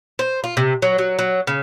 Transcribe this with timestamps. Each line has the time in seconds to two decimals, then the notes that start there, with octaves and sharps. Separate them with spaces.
0.19 C5
0.44 F4
0.57 C3
0.82 F#3
0.98 F#3
1.19 F#3
1.47 C#3